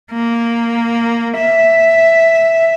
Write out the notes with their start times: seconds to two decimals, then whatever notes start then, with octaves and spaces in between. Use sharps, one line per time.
0.12 A#3
1.37 E5